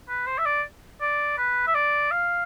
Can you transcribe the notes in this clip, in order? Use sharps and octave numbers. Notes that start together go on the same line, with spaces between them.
B4
C5
E5
D5
D5
B4
E5
D5
F5